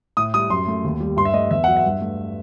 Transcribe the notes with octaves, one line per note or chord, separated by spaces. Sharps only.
A2 D#6
G3 D#6
F#2 C6
A3
D#2
G3
G2 C6
E5
A3 D#5
E2 E5
F#3 F#5
E5
G2
A3